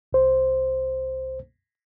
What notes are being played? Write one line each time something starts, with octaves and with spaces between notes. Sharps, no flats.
C2 C5